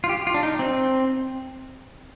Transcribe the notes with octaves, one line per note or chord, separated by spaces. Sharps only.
F4
G4
F4
D4
D#4
C4